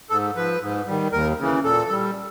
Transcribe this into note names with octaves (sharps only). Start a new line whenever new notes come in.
G#2 A4
F3 B4
G#2
D#3 G3
D#2 A#4
C#3 E3
A#2 A4
G3